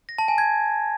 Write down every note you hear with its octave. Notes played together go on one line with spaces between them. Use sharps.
A#6
A5
G#5
G#6